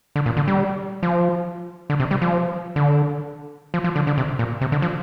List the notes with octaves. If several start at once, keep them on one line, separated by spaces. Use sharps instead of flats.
D3
A#2
D3
G3
F3
D3
C3
G3
F3
D3
F3
F3
D3
D3
C3
A#2
C3
D3
F3